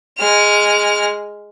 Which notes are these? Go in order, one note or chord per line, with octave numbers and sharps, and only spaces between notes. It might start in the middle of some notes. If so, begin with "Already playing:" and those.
G#3 F6